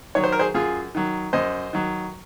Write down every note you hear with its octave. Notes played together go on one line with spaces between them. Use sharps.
D#3 F#3 C#5
C5
A#4
G#4 C5
F#2 F4 G#4
D#3 F#3
F#2 C5 D#5
D#3 F#3